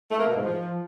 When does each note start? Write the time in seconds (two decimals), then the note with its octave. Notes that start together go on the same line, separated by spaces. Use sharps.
0.11 A3
0.19 A#3
0.27 B2
0.36 G#2
0.44 F3